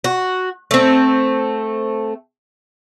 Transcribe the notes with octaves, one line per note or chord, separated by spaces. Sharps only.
F#4
A3 C4